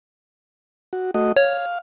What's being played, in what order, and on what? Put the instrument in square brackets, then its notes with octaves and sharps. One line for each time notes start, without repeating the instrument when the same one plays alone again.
[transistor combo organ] F#4
A3 F#4 D#5
[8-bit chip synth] C#5 [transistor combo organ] F5